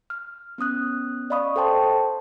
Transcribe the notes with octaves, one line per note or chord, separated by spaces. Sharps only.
F6
B3 C#4 D#6 F#6
D5 D#5 F5 B5 C#6 D#6
A4 C5 G5 A5 C6